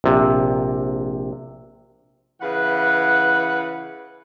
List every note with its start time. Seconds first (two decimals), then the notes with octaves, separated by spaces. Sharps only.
0.04 A#1 C3
2.41 C#3 E3 B4 F#5